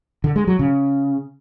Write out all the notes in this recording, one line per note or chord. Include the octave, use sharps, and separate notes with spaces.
D3
G#3
F#3
C#3